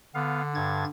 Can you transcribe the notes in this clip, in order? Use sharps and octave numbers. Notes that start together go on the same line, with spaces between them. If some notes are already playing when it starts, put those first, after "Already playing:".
D3 B3 F5
G2 G#6 A6